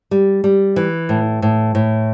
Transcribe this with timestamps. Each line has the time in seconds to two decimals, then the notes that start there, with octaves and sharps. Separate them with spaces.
0.11 G3
0.44 G3
0.76 E3
1.09 A2
1.42 A2
1.75 A2